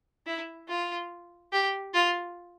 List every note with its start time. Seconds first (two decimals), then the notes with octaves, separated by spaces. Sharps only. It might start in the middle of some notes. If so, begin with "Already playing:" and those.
0.27 E4
0.69 F4
1.52 G4
1.94 F4